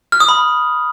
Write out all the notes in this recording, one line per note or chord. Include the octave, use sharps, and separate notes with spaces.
F6
D#6
B5